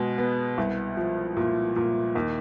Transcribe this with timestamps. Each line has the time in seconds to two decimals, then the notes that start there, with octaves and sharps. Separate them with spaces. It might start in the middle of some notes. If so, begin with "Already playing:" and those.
Already playing: B2 G#3
0.18 B3
0.58 C2
0.97 F3
1.37 A#2
1.76 A#2
2.15 D#2